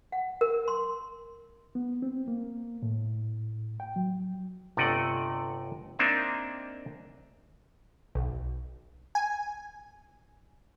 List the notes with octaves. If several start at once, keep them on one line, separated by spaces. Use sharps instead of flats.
F#5
A#4
C6
B3
C4
A#3
A2
G5
F#3
G1 C3 A3 D5 D#5 F#5
A#3 C4 D4 D#4 E5
B1
G#5